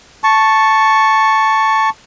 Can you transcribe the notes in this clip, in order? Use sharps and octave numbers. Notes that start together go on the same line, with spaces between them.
A5 C#6